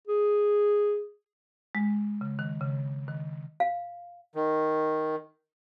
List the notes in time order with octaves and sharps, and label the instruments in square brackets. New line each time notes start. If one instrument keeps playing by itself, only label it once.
[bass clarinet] G#4
[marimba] G#3
C#3
D#3
C#3
D#3
[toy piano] F5
[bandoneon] D#3